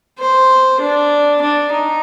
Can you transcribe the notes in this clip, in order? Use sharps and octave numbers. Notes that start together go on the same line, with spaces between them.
C5
D4
D4
D#4